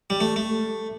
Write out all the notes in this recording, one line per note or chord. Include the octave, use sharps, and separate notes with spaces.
G3
A3
A3